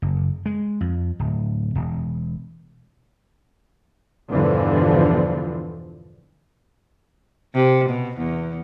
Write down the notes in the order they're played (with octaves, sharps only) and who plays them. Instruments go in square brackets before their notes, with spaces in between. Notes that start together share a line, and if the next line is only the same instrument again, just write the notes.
[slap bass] F#1
G#3
F2
D1
E1
[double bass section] E2 G2 B2 D3 E3 F3
[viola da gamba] C3
B2
E2